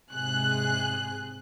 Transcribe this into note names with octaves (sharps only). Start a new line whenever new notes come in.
G#2 C3 G#4 F#6